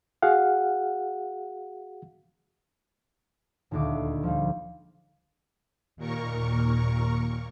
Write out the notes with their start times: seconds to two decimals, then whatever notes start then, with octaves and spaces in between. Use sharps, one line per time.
0.22 F#4 G#4 F5 F#5
3.71 D#1 D2 D6
4.23 F3 G3
5.96 D#2 A#2 A#4 C#6